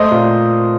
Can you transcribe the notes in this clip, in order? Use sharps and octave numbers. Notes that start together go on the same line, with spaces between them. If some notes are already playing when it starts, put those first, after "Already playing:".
Already playing: A3 C5 D#5
A#2